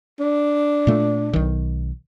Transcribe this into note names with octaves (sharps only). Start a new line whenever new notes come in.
D4
A#2 A3
B1 D#3